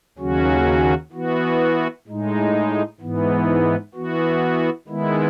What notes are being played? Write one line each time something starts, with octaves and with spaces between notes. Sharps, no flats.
D#2 C#3 F#3 C#4 F#4
E3 B3 F#4
A2 G#3 D#4
G#2 E3 B3
E3 B3 F#4
D#3 G#3 B3 E4